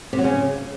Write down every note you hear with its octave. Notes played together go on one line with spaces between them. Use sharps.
C3
F#3
C#3